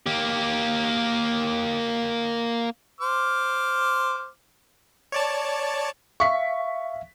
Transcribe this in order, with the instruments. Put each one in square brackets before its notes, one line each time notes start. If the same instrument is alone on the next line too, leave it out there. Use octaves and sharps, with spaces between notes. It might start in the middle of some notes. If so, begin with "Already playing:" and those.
[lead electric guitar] A#3 G4
[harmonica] C5 D6 F6
[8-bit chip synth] C#5 D5 A5
[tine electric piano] E5 F5 [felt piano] C#6 B6